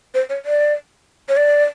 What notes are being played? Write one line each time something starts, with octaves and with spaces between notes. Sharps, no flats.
C5
C#5
D5
C#5
D5